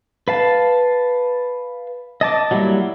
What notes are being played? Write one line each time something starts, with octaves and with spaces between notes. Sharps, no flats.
B4 F5 A5
D#5 A5 D6
F#3 G3 A#3 E4